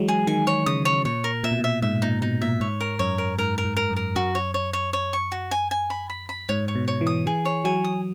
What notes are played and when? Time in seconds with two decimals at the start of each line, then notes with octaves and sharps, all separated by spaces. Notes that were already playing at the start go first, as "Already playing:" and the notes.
Already playing: E3 F#3 G#3
0.08 G#4
0.27 D#3 G#5
0.47 C#5
0.66 C#3 D#6
0.85 C#5
1.05 A#2 C#5
1.24 A#4
1.43 A#2 E5
1.51 B2
1.59 A#2
1.64 E5
1.82 G#2 E5
2.02 A#2 D#4
2.22 B2 D#4
2.41 A#2 E5
2.60 G#2 C#5
2.81 A#4
2.99 F#2 C#5
3.18 A#4
3.38 G#2 A#4
3.58 A#4
3.65 G#2
3.77 A#4
3.90 F#2
3.96 A#4
4.15 F#2 F#4
4.35 C#5
4.54 C#5
4.73 C#5
4.93 C#5
5.13 C#6
5.32 F#4
5.51 G#5
5.71 G#5
5.90 B5
6.10 B5
6.29 B5
6.49 G#2 C#5
6.68 C#5
6.75 B2
6.88 C#5
7.01 E3
7.07 D#6
7.26 E3 G#4
7.45 C#5
7.64 F#3 G#5
7.84 D#6